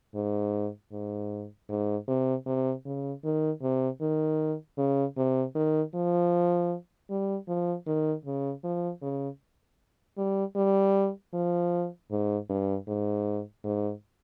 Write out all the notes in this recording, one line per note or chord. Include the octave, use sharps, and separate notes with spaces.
G#2
G#2
G#2
C3
C3
C#3
D#3
C3
D#3
C#3
C3
D#3
F3
G3
F3
D#3
C#3
F3
C#3
G3
G3
F3
G#2
G2
G#2
G#2